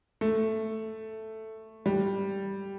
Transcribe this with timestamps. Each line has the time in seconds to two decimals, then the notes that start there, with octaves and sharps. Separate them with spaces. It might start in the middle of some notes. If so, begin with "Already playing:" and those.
0.21 A3
1.86 G3